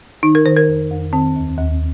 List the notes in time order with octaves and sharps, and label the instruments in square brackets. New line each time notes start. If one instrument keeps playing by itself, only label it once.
[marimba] D#3 D#4
A#4
D#3 C5
A#4
F2
F2
D#3 C4
D#2
D#2